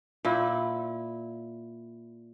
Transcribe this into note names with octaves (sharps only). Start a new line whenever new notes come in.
A#2 E4